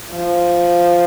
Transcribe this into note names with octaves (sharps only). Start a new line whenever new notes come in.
F3